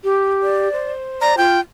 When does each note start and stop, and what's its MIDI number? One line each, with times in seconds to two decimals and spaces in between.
0.03 0.68 67
0.43 0.92 74
0.72 1.44 72
1.21 1.36 74
1.21 1.36 82
1.38 1.58 65
1.38 1.60 79